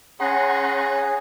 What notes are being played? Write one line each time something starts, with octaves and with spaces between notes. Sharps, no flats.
C#4 G#4 F#5 A#5 C6